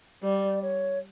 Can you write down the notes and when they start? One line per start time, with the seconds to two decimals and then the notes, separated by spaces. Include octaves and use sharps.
0.22 G3 D5
0.62 C#5